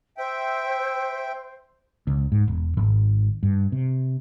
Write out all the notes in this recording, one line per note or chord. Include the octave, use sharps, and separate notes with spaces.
C5 E5 G5
C#2
G#2
E1
G#1
G2
C3